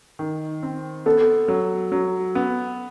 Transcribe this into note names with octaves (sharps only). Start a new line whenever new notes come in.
D#3
C4
B3 A4
F#3
F#3
B3